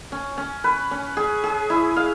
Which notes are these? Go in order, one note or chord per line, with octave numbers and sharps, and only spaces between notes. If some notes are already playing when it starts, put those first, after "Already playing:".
C#4
C#4
B4
C#4
G#4
G#4
E4
F5